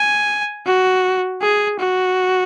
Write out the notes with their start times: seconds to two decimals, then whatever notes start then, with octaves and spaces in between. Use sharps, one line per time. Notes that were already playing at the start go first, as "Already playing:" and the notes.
Already playing: G#5
0.66 F#4
1.41 G#4
1.79 F#4